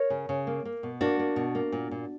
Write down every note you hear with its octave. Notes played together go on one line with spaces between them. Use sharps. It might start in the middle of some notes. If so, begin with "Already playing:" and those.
Already playing: A#4 C#5
C#3
C#3
A#3
A#3
B2
A#3 D4 F#4
A#3
B2
A#3
A#2
A#2